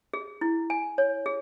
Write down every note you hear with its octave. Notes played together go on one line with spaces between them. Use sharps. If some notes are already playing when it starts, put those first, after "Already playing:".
G#4
E4
G#5
C#5
G#4